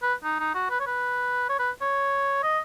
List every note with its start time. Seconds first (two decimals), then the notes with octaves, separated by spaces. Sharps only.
0.03 B4
0.24 D#4
0.40 D#4
0.54 F#4
0.70 B4
0.80 C#5
0.86 B4
1.49 C#5
1.59 B4
1.81 C#5
2.43 D#5